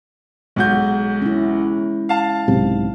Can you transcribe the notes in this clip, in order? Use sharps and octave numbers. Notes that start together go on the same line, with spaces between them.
B1 G#3 F#4 G6
C#4 E4
F5 A5
B1 G#2 C3